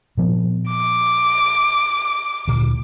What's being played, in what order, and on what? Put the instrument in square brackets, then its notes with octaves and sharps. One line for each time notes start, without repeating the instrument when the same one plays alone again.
[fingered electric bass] A#2 F3 B3
[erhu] D6
[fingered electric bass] D2 A#2